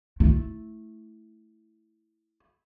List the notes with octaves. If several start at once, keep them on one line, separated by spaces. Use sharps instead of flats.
A3 E4